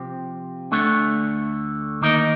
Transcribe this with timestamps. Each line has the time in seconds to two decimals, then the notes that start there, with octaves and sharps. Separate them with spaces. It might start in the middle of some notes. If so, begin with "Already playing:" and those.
Already playing: C3 F3 C4 G4
0.72 D2 D3 A3
2.02 D#3 A#3 D#4 A#4 D#5